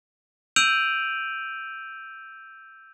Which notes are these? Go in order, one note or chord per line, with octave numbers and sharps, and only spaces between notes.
E6 G6 D7 D#7 F7 F#7